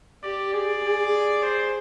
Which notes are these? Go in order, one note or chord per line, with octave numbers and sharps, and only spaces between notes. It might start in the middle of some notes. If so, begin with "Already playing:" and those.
G4 D5
G#4 D5
G#4
C5